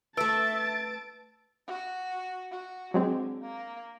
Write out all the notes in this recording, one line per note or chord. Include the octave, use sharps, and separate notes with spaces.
A3 A4 B4 E5 A5 E6 A6 D7
F#4
F#4
D3 F#3 G#3 C4
A#3